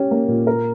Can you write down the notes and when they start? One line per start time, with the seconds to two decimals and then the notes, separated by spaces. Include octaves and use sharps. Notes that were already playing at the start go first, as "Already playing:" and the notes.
Already playing: C#4 G4
0.11 A#3
0.28 A#2
0.47 A#4